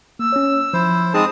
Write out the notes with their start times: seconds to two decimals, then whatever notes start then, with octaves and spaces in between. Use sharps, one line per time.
0.19 A#3 E6
0.32 C#4 C#5
0.73 F3 E4 C5
1.14 G#3 C4 D#4 G#4 A5 D#6